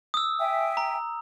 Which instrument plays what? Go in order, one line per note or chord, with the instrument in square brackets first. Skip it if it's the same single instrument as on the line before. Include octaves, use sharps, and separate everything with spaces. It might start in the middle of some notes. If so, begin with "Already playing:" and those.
[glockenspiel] D#6 E6
[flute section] E5 G5 G#5
[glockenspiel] A#5